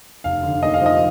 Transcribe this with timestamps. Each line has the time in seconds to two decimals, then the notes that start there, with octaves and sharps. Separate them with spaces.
0.24 F1 F5
0.43 D3
0.62 D#2 D#5
0.74 F5
0.82 F3 D#5